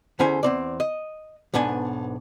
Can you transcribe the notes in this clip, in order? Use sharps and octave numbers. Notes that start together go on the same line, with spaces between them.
E2 D3 C#4 E4 C5 G#5
E2 C4 D5
D#5
B1 G#2 B3 D4 G#5